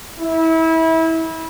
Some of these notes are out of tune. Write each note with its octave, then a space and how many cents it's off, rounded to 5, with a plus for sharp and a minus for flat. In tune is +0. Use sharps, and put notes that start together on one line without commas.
E4 -25